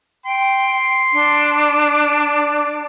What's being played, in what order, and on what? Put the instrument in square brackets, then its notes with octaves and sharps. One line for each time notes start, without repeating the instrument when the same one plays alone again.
[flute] G5 [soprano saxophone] C6
[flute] D4
[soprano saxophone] D5